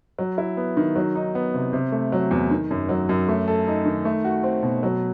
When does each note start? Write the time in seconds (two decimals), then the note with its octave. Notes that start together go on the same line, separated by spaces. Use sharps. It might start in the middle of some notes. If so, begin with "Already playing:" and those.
0.19 F#3
0.38 E4
0.57 B3
0.77 D#3
0.96 F#3
1.15 D#4
1.35 B3
1.54 C3
1.73 C3
1.92 A3
2.12 F#3
2.31 E2
2.51 D#3
2.71 F#2
2.89 F#3
3.09 F#2
3.28 A3
3.48 A4
3.67 D#4
3.85 D#3
4.05 A3
4.24 F#4
4.43 C4
4.63 B2
4.83 F#3